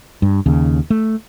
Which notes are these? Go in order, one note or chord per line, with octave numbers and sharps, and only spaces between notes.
G2
D#2 C#3
A3